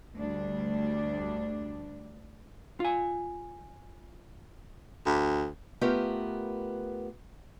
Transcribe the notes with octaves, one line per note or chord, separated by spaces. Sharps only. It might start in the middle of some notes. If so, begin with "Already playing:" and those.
D2 G3 D4
F4 G#5
D2
A3 B3 F4 G4 A#4